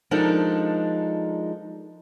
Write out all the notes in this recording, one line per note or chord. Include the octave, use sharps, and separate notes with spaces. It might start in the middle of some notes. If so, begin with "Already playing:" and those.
F3 G#3 D4 D#4 A4 A#4